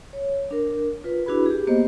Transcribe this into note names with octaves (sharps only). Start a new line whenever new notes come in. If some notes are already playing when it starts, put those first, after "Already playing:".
C#5
D4 A#4
F4 B4
D4 E4 F#4 G#4 B4 B5
G4 G#4
A#3 B3 G4 C5 D#5